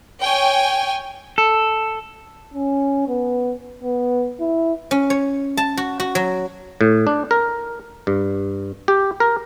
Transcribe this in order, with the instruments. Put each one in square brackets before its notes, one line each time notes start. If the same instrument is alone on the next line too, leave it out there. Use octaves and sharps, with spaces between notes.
[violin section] C#5 G5 G#5
[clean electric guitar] A4
[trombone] C#4
B3
B3
E4
[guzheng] C#4
C#5
A5
F#4
F#4
F#3
[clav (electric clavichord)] A2
D4
A#4
G2
G4
A#4